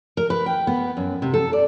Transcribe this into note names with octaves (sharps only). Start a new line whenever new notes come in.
A#4
B4
G5
B3
F#2
C3
A4
D5